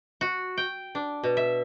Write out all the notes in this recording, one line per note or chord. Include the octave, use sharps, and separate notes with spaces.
F#4
G5
D4
B2
E5